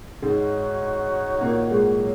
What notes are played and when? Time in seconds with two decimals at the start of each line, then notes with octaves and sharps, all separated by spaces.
0.22 G#2 G#3 D#4 F#4 C#5 F#5
1.41 A#2 A#3
1.70 G#2 G#3
2.00 F#3